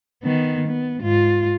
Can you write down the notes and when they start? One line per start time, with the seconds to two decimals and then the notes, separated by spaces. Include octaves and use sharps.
0.23 D#3 B3
0.67 B3
0.99 G#2 F4